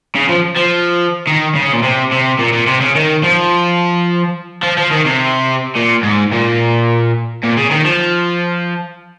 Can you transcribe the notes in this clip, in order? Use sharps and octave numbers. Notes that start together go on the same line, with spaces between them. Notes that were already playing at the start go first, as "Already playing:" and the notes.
C#3
F3
F3
D#3
C#3
A#2
C3
C3
A#2
A#2
C3
C#3
D#3
F3
F3
F3
D#3
C3
A#2
G#2
A#2
A#2
C#3
D#3
F3